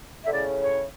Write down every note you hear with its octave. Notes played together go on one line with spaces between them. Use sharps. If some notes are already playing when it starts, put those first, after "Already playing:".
D3 E5
A2 C#3 D5
C#5